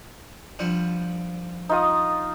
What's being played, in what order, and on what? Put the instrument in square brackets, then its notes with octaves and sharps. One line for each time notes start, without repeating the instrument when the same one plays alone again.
[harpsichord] D3 F3 G3
[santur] D#4 F4 D#6